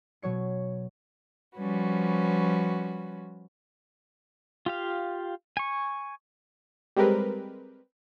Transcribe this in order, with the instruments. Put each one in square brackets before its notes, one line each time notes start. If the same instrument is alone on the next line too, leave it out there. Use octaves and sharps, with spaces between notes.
[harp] B2 F#3 C#5 C#7
[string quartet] F3 G3 C#4 F#4 B4
[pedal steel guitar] F4 G4 F5
G#5 C#6
[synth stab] G3 G#3 C4 G4 A#4 B4